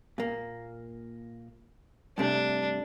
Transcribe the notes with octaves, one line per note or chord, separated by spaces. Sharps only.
A#2 A#3
G2 C3 A3 D4